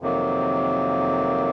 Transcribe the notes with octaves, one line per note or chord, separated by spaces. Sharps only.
F2 C3 D#3 F#3 A#3